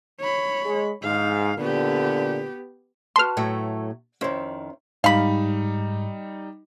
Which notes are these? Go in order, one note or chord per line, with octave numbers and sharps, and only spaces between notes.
C#5 B5
G#3
G#2 F5
A#2 D3 B3 G4
F#4 B4 A5 C6 F6
A2 F#3 A3
F2 D#3 C#4 E4 C5
G#2 G3 D#4 F5 B5